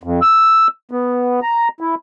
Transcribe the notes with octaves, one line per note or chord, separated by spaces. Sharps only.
F2
E6
B3
A#5
E4